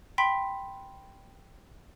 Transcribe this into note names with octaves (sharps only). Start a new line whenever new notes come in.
G5 B5 C6 B6